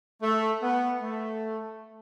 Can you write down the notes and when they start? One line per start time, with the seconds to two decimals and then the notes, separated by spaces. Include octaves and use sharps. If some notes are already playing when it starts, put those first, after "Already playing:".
0.23 A3
0.63 B3
1.02 A3